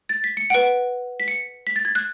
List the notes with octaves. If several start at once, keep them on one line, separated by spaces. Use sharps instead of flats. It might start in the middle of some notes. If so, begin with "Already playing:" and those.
A6
B6
C#7
B4 F#5 D7
B6
C#7
B6
A6
G#6
F#6